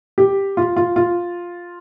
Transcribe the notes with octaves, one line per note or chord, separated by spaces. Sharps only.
G4
F4
F4
F4